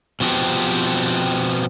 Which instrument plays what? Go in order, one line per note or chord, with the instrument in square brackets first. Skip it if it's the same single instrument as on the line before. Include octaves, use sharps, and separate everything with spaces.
[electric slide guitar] B2 F3 B3 C4 G4